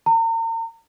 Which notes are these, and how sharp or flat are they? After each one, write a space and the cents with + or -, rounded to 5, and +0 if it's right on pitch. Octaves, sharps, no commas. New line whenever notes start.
A#5 -40